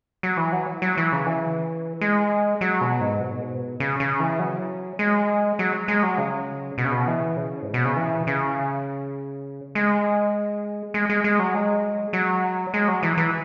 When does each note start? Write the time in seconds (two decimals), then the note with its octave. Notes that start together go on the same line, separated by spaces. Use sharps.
0.23 F#3
0.37 E3
0.52 F#3
0.82 F#3
0.97 E3
1.12 C#3
1.26 E3
2.01 G#3
2.61 F#3
2.81 B2
3.00 G#2
3.21 B2
3.31 G#2
3.42 B2
3.80 C#3
4.00 C#3
4.20 E3
4.39 F#3
4.99 G#3
5.59 F#3
5.88 G#3
6.03 F#3
6.18 C#3
6.78 B2
6.85 C#3
6.92 B2
7.07 E3
7.37 C#3
7.62 G#2
7.74 B2
7.85 C#3
7.96 E3
8.27 C#3
9.75 G#3
10.94 G#3
11.10 G#3
11.24 G#3
11.39 F#3
11.54 G#3
12.13 F#3
12.74 G#3
12.88 F#3
13.03 E3
13.17 E3